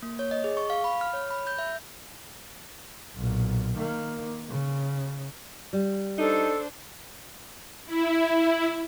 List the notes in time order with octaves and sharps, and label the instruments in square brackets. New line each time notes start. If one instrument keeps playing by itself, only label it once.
[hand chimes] A#3
C#5
D#5
G#4
C#6
F5
B5
F6
C#5
B5
G6
E5
[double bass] B1 A#2
D#3 A#3
C#3
[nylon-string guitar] G3
[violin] D4 C5 [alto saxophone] D#4 [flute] A4
[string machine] E4